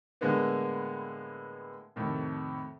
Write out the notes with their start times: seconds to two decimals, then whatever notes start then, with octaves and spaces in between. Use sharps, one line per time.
0.21 A2 D3 G#3 A#3 B3
1.96 F2 A2 C3 D#3